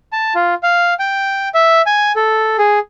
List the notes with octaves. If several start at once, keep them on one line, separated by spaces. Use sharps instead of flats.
A5
F4
F5
G5
E5
G#5
A4
G#4